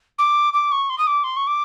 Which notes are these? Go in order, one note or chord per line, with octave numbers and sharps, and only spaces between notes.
D6
D6
C#6
C6
D#6
D6
C6
C#6
D6